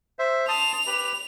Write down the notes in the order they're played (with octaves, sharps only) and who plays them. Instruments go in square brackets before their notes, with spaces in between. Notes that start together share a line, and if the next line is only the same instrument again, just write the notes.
[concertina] C5 E5
[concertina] A5 C6 D#6 [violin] F7
[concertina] G4 B4 B5